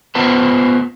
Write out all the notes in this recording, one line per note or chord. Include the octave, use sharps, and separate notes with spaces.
B3 F4 B4 C5 A5